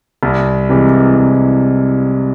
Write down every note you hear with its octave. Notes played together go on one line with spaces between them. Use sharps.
C2
C3 E3 G#3
C2